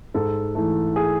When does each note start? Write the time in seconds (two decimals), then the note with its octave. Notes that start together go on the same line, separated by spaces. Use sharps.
0.14 G#2 A4
0.55 E3 A3
0.96 G#4